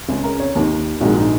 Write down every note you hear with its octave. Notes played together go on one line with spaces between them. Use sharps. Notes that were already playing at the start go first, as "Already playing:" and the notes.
C#2 C#3
A#4
C#5
D#2 D#3 A#4
A#1 G#2 D#3 F#4
D#4